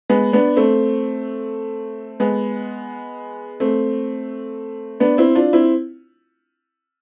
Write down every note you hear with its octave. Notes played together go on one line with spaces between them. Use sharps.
G#3 B3
B3 D4
A3 C4
G#3 B3
A3 C4
B3 D4
C4 E4
D4 F4
C4 E4